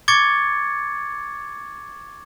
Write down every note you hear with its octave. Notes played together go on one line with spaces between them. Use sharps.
C#6 D6 G#6 A6 C#7